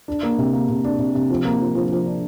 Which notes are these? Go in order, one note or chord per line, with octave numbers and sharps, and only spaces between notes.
D4
A#3
C3
A#3
C3
D4
C3
C3
F3
A#3
F3
F3
F3
D4